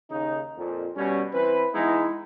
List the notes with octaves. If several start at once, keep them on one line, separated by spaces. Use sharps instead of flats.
D#2 C#3 D#4
F2 A#2
B2 G3 C#4
E3 C4 B4
E3 G#3 B3 D#4 E4